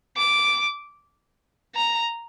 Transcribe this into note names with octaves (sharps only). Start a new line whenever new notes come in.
D6
A#5